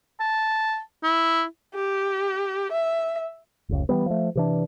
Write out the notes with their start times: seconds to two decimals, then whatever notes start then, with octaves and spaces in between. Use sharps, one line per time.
0.20 A5
1.03 E4
1.75 G4
2.72 E5
3.69 F1 C#2
3.89 E3 F3 G3 B3
4.06 F3 A3
4.35 C3 E3 D4